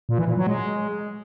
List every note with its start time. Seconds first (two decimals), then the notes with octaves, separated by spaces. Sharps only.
0.09 A#2
0.18 E3
0.28 A#2
0.37 F#3
0.47 G#3